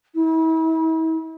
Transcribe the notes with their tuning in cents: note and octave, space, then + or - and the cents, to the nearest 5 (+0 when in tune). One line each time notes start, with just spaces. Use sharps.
E4 -40